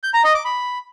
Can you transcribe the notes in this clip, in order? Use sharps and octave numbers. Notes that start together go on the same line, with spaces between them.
G6
A#5
D#5
D6
B5